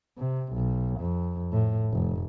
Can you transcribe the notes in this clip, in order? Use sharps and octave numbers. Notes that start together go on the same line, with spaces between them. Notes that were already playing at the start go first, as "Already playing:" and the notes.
C3
B1
F2
A2
F1